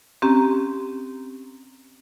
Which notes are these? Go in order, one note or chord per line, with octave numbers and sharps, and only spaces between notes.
C4 C#4 G4 A#5